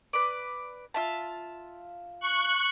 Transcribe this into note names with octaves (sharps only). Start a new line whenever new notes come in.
B4 D5
F4 E5 A5
C#6 F#6